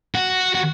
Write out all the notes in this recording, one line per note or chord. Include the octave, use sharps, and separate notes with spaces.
F#4
F#4